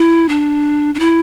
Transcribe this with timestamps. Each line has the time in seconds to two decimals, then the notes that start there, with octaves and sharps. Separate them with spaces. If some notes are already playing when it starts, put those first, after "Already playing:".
Already playing: E4
0.29 D4
0.95 D4
1.00 E4